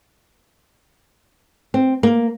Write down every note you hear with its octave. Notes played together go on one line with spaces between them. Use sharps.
C4
A#3